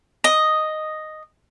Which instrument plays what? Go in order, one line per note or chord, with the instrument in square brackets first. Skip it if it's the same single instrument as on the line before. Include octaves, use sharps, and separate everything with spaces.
[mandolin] D#5